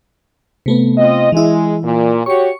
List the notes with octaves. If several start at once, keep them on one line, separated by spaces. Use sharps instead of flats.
C3 A3 B3
C4 F4 D#5
E3 G#3 E4
A#2
F#4 G4 C#5 C#6 C#7